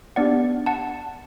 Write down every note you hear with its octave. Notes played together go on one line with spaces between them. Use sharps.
B3 D4 G4 D5 F#5
F#5 A5